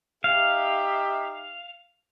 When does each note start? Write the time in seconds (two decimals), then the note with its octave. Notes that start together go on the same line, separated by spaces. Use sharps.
0.24 D#4 G4 E5 F5